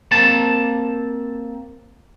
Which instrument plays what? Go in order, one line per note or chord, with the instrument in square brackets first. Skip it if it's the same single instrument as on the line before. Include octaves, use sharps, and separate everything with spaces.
[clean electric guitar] A#3 C4 A5